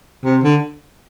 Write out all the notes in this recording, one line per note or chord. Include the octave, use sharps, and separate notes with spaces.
C3
D3